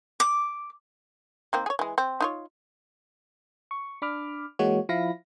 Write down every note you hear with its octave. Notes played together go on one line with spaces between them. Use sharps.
D6
D#3 A#3 C4
G#4 C#5
E3 G#3
C4
D#4 F4 C#5
C#6
D4 B5 D6 F6
E3 G#3 A#3 F#4 C#5
F3 E4 F5 B5 A#6